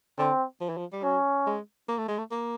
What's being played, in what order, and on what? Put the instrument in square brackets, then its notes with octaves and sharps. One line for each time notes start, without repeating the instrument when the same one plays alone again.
[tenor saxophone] D3 [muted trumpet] C4
[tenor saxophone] F3
E3
F3
G3
[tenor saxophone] F#3 [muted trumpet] C#4
[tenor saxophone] G#3
A#3
A3
G#3
A3
A#3